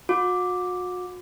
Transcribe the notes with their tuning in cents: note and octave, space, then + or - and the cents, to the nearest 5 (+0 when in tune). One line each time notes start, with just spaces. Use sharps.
F#4 -40 D6 +0